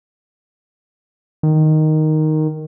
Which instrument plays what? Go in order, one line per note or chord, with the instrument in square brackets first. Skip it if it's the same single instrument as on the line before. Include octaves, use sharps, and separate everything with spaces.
[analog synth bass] D#3